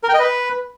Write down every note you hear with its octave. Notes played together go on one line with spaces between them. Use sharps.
A#4
G5
D#5
B4